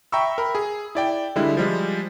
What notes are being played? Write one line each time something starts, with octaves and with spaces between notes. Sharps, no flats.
E5 G5 A#5 B5 C#6 E6
A#4 B5
G#4
E4 D5 G5
D3 G3 G#3 E4
F3 G3 G#3